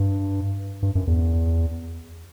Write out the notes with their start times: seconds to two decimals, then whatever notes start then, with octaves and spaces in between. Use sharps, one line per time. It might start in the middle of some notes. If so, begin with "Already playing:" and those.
Already playing: G2
0.83 G2
0.95 F#2
1.07 E2